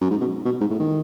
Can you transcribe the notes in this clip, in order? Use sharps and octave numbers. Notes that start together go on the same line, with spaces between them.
F#2
G#2
B2
B2
G#2
A2
D#3